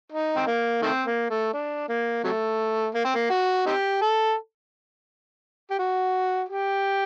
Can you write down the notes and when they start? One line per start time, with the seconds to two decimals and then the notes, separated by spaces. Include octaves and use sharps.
0.12 D#4
0.36 C4
0.47 A#3
0.82 D#3 A3 C4
1.06 A#3
1.30 A3
1.53 D4
1.88 A#3
2.24 C3 F#3 A3
2.94 A#3
3.05 C4
3.15 A#3
3.30 F#4
3.66 C4 D#4 G4
4.02 A4
5.70 G4
5.78 F#4
6.48 G4